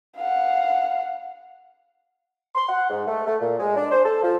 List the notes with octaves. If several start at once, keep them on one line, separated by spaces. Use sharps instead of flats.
F5 F#5
C6
F#5
G#2
A3
A3
A#2
G#3
D4
C5
A4
F3